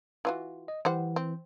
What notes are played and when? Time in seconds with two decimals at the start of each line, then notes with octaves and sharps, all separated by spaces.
0.25 E3 F4 F#4
0.68 D#5
0.85 E3 G3 C5 F#5
1.16 C4